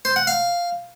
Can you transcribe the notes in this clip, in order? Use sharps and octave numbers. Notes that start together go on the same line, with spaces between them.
C5
F#5
F5